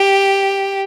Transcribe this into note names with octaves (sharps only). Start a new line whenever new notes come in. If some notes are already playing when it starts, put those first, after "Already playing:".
Already playing: G4